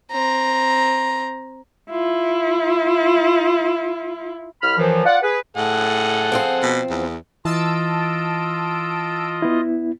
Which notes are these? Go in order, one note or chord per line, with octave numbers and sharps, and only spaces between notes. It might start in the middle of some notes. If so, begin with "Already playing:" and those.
C4 A#5
E4 F4
C2 B5 F6
F#2 E3 F3
F4 D5 F#5
G#4 B4
A2 G#4 A4 F#5
F3 C4 C5
B2
E2
E3 F4 D#5 A5 E6 D7
B3 E4